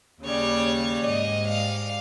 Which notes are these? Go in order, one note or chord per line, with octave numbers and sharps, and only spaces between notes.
D#2 C#3 G3 C#5
G#2 G3 D#5
F5